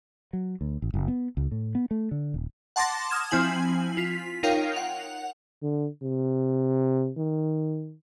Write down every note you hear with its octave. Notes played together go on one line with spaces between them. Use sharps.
F#3
D2
A1
F#1
B3
C#2
A2
B3
A3
D3
D#1
F#5 A5 C6 D6 A6 A#6
D#6 F6 G#6 E7
F3 C4 E4 G#5 F#7
F4 B6
D#4 F4 A#4 C#5 F5 G5
F#5 F7
D3
C3
D#3